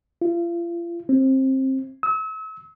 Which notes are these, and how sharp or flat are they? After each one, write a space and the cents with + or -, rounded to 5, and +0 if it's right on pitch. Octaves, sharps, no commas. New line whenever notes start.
F4 -40
C4 +20
E6 -40